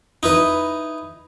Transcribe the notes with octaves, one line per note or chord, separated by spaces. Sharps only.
D#4 E4 B4